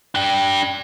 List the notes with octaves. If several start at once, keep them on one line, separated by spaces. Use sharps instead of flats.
D4 G5